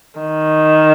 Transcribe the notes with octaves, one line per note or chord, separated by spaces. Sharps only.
D#3